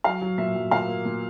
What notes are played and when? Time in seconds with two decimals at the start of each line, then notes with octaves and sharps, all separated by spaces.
0.04 F#3 F5
0.22 F#3
0.38 A#2 E5
0.55 F#3
0.71 A#2 F5
0.88 A#3
1.05 A#2